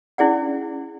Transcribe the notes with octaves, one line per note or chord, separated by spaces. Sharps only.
C#4 E4 G#4 D5 F#5